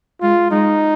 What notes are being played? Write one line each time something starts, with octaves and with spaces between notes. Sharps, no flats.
G#3 F4
G#3 D#4